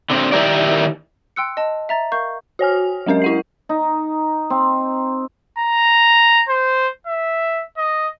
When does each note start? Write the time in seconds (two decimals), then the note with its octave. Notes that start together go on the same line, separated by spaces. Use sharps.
0.10 D3 C4
0.32 D#3 E4 G4 A#4 D5
1.36 G5 C6 E6 F#6 C#7
1.57 D#5 A5
1.89 E5 A#5 A6
2.12 A#4 F5 C#6 G6
2.59 F#4 C#5 G#5 F6
3.06 F#3 G#3 C#4 A#4 D#5
3.22 E4 F#5 C7
3.69 D#4
4.50 C4
5.59 A#5
6.49 C5
7.07 E5
7.77 D#5